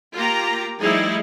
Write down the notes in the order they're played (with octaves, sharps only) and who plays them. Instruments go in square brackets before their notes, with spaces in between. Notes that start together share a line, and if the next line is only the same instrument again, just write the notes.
[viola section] A#3 F4 G4 A#5
F3 G3 A3 D#4 E4 G#4